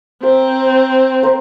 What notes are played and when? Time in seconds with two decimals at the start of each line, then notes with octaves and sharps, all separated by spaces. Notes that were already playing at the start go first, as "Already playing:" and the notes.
0.23 C4 A#4 C5
1.23 A#4 C5